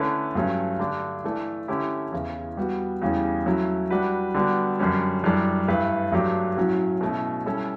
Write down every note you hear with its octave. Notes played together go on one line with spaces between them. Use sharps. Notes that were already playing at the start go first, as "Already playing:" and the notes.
Already playing: D3 A3 C#4 E4 B4
G2 F#3 A3 C#4
D3 A3 D4 G4
E3 A3 D4
D3 A3 C#4 E4 G4
E2 C#3 E3
G3 B3 F#4
E2 C#3 G3 C#4 G4
F#3 A3 C#4 E4
G3 D4 F#4 B4
D3 G3 B3 D4 F#4
F#2 D3 G3 C#4
F#2 E3 G3 D4 A4
G2 E3 A3 E4 B4
G2 F#3 A3 D4 G4
A2 F#3 C#4 F#4
B2 A3 C#4 E4
G3 C#4 E4 A4